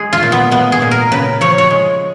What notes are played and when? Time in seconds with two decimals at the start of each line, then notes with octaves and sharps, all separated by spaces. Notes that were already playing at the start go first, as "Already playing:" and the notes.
Already playing: G#3 G#4
0.13 F4
0.23 A#2
0.32 B3
0.51 G#3 B3
0.72 G#4
0.82 A#2
0.91 A#4
1.12 C#3 B4
1.41 F3 C#5
1.58 C#5
1.70 G#3